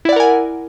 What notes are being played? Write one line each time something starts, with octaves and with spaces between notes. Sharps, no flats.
E4 A#4 D5 F#5 G#5